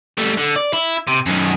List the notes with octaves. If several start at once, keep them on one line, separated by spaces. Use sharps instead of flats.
G3 A3
D3
D5
E4
C3
F#2 D#3